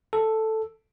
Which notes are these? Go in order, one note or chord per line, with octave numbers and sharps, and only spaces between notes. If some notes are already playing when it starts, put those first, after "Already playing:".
A4